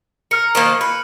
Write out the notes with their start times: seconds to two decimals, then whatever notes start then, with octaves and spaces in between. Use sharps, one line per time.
0.31 A#4 F6 C#7
0.55 D#3 F3 A#3
0.81 B4